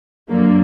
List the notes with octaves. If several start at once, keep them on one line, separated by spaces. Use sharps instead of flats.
F#2 D3 F#3 A#3